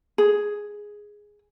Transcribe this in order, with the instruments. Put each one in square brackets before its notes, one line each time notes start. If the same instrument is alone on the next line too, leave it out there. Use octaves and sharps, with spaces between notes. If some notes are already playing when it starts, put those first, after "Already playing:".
[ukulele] G#4